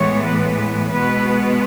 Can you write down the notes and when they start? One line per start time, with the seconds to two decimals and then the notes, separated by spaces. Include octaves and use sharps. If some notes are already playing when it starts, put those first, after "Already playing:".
Already playing: A2 E3 G#3 B3 C#5
0.26 B4
0.92 B2 G#3 B3 B4